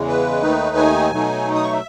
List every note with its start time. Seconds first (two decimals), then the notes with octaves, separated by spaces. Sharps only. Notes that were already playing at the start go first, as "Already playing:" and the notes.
Already playing: E2 C#3 E3 G#3
0.08 B4
0.42 D#2 D#3 A3 D#4
0.77 G#5
1.12 B2 F#3 A3 D#4
1.55 D#6
1.63 C#6
1.72 E5